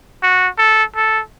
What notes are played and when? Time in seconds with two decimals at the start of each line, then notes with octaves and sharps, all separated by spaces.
0.23 F#4
0.58 A4
0.96 A4